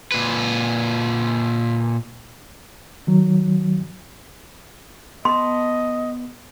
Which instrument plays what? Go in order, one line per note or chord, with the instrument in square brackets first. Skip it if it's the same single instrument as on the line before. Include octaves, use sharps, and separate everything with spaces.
[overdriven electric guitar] A#2 B4
[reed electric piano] D#3 F#3
[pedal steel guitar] B3 A5 [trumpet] D#5 [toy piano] C6